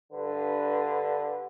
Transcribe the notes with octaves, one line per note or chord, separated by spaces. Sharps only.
G2 D3 B4